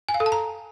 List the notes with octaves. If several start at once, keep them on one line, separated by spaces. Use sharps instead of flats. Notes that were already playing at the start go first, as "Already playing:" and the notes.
G#5
F5
A4
A5
A#5